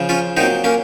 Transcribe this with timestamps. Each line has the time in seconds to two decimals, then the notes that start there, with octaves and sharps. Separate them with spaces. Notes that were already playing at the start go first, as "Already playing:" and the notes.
Already playing: C#3 F3
0.09 C#4 F4
0.37 A#2 F#3 C4 D#4
0.64 A#3 C#4